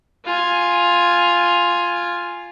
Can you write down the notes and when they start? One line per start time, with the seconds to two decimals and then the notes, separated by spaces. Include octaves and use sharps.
0.25 F4 G#5